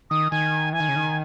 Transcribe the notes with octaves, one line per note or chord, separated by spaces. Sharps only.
D#3 D#6
D#3 G#5
E3 G#5
D#3
C#3
D#3